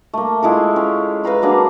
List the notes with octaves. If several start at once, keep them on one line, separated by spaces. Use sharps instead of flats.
A3 A#3
G#3 E4 F4 A4
C#4
B4 F5 A#5 B5
F#3 A#3 D4 G#4